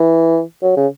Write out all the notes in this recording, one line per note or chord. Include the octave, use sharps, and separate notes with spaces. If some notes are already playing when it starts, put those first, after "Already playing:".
Already playing: E3
F#3
C#3